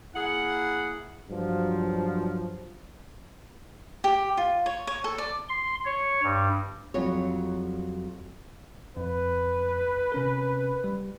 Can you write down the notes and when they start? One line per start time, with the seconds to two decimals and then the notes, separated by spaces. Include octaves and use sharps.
0.14 A#3 E4 G#4 F#5
1.28 G2 F3 F#3
4.04 G4
4.37 F4
4.66 C#5
4.87 C#5
5.04 A4
5.18 D5
5.49 C6
5.85 C#5
6.23 G2
6.94 F2 F#3 G3 C#5
8.97 F2 B4
10.12 C3 C#4 A#4
10.84 G3